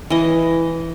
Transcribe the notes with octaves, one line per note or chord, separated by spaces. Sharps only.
E3 D#5